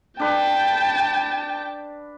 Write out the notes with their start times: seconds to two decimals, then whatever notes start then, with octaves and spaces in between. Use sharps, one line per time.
0.20 D4 B4 G5 A5